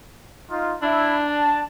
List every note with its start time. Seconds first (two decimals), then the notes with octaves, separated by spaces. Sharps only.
0.51 D#4 F4
0.82 D4 E4
1.28 A5